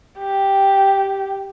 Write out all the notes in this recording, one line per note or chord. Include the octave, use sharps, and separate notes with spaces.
G4